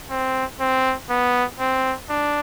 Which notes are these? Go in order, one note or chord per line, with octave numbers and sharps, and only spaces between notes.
C4
C4
B3
C4
D4